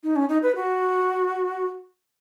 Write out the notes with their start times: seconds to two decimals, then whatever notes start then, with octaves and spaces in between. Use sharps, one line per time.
0.04 D#4
0.16 C#4
0.29 D#4
0.43 B4
0.56 F#4